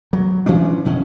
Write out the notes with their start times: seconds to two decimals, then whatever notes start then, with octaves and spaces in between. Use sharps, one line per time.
0.13 F#3
0.46 E3 F3 C#4 D4
0.85 F#1 B2 C#4